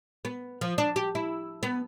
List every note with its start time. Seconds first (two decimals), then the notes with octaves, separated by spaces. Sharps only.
0.25 B3
0.61 F3
0.78 D4
0.96 G4
1.15 E4
1.63 B3